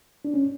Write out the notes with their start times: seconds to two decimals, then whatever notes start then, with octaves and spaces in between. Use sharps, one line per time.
0.25 D4
0.34 C#4